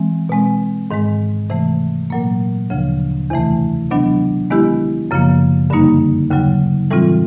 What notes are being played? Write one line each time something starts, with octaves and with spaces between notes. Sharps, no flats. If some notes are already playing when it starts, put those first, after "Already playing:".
Already playing: E3 G#3 C4
B2 G#3 C4
G#2 D#3 G#3
C3 E3 A3
A#2 F#3 A#3
D2 C#3 F3
E2 C3 E3 A3
C3 D#3 F#3 B3 D4
D#3 G#3 B3 E4 G4
F#2 C#3 F3 A#3
G2 D3 G3 A#3 D#4
D#2 C#3 F#3
A2 E3 G3 C4 F4